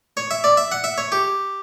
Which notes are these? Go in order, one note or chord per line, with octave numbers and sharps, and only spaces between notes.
C#5
E5
D5
E5
F#5
E5
C#5
G4